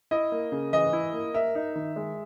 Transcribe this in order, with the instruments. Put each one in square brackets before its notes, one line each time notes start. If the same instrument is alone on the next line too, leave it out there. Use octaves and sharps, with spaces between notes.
[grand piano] E4 [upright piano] D#5
[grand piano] A#3
C#3
[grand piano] E3 [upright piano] D#5
[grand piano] E4
A#3
[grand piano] A#4 [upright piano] E5
[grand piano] D#4
D#3
G#3